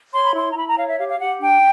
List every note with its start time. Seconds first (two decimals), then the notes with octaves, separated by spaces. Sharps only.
0.13 C#5 C6
0.26 B5
0.34 E4 C6
0.50 A#5
0.56 E4 B5
0.67 A#5
0.77 C#5 F5
0.88 E5
0.98 G4 F5
1.09 F5
1.20 G4 F#5
1.40 D4 G5